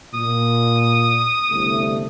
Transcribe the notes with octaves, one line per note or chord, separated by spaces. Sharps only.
A#2 D#6
G1 C2 A3